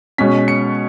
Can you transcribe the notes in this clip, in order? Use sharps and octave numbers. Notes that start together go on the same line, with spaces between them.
B2 G#3 C#4 B6
C#7